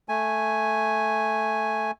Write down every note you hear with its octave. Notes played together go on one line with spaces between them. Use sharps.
A3 G#5